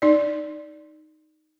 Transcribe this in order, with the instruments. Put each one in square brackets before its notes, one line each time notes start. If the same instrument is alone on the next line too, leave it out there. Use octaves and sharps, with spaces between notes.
[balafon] D#4 D5